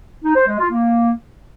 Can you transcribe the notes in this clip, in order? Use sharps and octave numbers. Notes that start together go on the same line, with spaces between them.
D#4
C5
G#3
F4
A#3